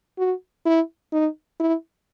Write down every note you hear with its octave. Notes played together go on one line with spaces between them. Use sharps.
F#4
E4
D#4
E4